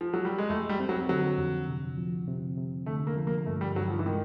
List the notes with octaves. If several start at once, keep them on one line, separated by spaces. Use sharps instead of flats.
F3
F#3
G3
G#3
F2 A3
G3
C4
F#3
D3 F#3
F2
C3
F3
C3
C3
D3 A3
A#3
F3
A#3
G2 A3
G3
G2 F#3
F3
E3
D#3 G#3